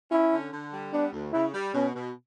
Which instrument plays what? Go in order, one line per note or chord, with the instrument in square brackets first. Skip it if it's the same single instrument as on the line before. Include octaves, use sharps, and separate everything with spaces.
[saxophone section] C#4 [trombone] E4
[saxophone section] D3
D3
G3
[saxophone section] B3 [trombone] D4
[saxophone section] D2
[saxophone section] C#3 [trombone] E4
[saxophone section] G3
[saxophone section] B2 [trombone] C#4
[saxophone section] B2